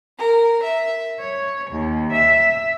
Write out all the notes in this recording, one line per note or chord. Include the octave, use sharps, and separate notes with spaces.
A#4
E5
C#5
D#2
E5